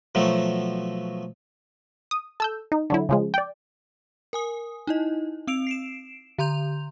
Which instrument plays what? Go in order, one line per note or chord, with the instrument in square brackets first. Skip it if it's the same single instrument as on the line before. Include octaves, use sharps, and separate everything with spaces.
[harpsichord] B2 F3 F#3 A3
[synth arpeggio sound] D#6
A4 E6 G6
D#4
D3 F#3 E4
C#3 F3 G#3
D5 G5
[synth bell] A#4 G#5 D#6
D#4 E4 D#5
C4 E6 D7 F7
C7 D7 E7
D3 A#5 C6 G6 F7